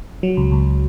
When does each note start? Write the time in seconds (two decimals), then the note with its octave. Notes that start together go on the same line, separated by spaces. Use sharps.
0.23 F#3
0.37 C#2
0.52 C#2